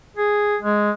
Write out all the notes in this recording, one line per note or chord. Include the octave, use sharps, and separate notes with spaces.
G#4
G#3